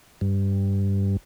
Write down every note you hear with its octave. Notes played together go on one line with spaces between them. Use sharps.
G2